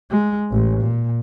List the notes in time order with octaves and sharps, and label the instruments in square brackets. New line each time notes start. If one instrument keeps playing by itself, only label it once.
[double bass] G#3
A1
A#2